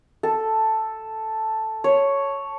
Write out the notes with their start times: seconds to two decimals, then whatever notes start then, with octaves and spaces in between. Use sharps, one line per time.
0.23 A4
1.84 C#5